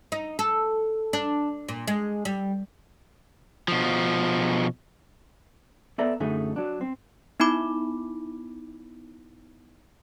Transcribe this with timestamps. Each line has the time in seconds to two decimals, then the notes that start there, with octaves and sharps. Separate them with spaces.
0.12 D#4
0.39 A4
1.13 D4
1.68 A#2
1.88 G#3
2.25 G3
3.68 B2 F3
5.98 B3 A4 D5 E5 A#5
6.20 F#2 D3 A3 D#4 G#4
6.56 F#3 D4
6.81 C4
7.40 B3 D#4 E4 B5 D6